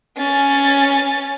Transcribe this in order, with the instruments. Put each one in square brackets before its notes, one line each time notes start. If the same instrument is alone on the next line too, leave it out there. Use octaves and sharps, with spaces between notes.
[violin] C#4 A6